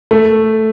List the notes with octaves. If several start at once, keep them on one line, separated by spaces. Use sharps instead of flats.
A3